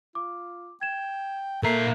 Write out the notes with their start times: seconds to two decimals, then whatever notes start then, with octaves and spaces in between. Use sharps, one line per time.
0.15 F4 D6
0.81 G5 G#6 E7
1.63 A#2 A#3 A4 A#4 E5 A#5 C7